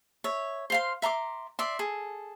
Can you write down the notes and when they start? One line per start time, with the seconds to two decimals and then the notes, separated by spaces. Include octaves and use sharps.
0.24 C#5 E5
0.70 C5 F5 C6
1.02 E5 A#5 C6 D6
1.59 D5 E5 C6
1.79 G#4 A4